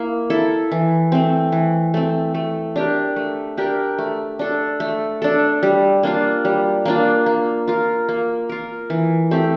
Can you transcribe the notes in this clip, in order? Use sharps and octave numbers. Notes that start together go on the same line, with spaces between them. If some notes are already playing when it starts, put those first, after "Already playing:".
Already playing: A#3 E4
E4 A4
E3
A3 C4
E3
A3 C4
A3
D4 G4 A#4
A3
D4 G4 A#4
A3
D4 A4
A3
D4 A4
G3
A#3 D4 F4
G3
A#3 D4 F4
A#3
F4 A#4
A#3
F4 A#4
E3
A3 C4 G4